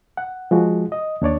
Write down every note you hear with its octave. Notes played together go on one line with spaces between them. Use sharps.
F#5
F3 G#3 F#4
D#5
D#2 D4 C#5 D5